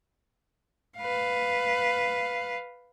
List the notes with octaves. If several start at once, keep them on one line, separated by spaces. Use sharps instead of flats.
B4 F5